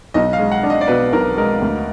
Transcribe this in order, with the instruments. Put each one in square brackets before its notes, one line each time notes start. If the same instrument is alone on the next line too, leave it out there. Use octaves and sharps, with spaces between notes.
[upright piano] B1 [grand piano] D#5
[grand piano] F5
[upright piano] G#3
[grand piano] F#5
[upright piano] D4
[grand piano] D#5
D5
[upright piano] B2 [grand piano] B4
[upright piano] B1 [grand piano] A#4
[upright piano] G#3 [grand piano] A#4
[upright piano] D2